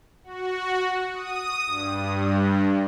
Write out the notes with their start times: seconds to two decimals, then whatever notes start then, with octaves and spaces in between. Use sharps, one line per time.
0.24 F#4
1.14 D#6
1.65 G2